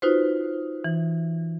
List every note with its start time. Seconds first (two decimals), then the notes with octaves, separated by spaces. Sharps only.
0.02 D#4 F4 F#4 B4 C5
0.84 E3